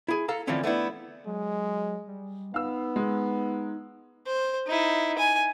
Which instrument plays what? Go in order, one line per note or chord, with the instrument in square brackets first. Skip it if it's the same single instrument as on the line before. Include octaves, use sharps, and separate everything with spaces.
[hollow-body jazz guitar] E4 G#4
A4 F5 A#5
D3 E3 F3 A3 C4 C#4
A3 B3 D4 E4
[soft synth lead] F#3 [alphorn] G#3
[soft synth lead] G3
[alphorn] B3 [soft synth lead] D#4 [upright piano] F5 E6
[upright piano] G#3
[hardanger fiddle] C5
D#4 E4
G#5